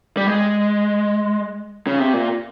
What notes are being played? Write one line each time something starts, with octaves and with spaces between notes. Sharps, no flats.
G3
G#3
C#3
C3
A#2